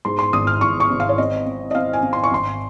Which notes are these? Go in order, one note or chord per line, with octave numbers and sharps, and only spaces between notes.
G#2 C6
C6
G#1 D#6
F6
G#1 C#6
C#6
G#1
F5
C#5
C4 D#5
C4
D#5
C4 F5
G#5
C4
C6
C#6
G#1 C6